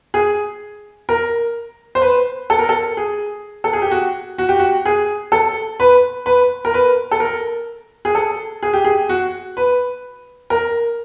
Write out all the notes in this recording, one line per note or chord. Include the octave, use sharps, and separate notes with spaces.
G#4
A#4
C5
B4
A4
A#4
A4
G#4
A4
G#4
G4
F#4
F#4
G4
F#4
G#4
A4
B4
B4
A#4
B4
A4
A#4
G#4
A4
G#4
G4
G#4
F#4
B4
A#4